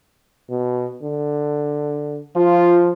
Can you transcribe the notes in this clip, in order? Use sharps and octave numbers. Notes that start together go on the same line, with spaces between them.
B2
D3
F3 F4